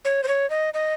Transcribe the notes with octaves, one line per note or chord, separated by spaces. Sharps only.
C#5
C5
C#5
D#5
D#5